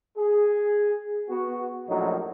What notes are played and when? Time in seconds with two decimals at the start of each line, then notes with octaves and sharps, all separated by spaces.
0.17 G#4
1.29 B3 F#4
1.88 A#1 F#2 A2 F#3 D#4